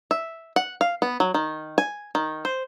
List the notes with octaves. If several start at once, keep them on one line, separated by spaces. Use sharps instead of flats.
E5
F#5
F5
B3
F#3
D#3
G#5
D#3
C5